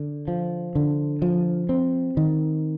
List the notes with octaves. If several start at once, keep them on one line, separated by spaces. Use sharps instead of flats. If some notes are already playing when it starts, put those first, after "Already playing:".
Already playing: D3
F3
D3
F3
C4
D#3